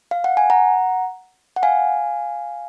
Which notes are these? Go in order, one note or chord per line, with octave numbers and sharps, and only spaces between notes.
F5
F#5
G#5
F#5 A#5
F#5
F5 G#5